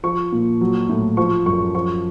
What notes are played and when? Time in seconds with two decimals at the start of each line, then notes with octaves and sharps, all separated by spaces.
0.04 F3 C#6
0.32 A#2
0.61 F#3
0.89 A2
1.17 F3 C#6
1.46 F#2 C#6
1.75 F3 C#6